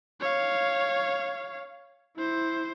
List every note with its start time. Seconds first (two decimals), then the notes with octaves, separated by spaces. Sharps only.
0.21 C#5 F5
2.16 E4 C5